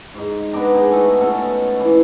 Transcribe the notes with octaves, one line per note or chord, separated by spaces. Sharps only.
G#2 D#4
B3 D4 D5 A#5
D#4 G#4
A3 B3 F#4 A4
B2 C#4 A4
E3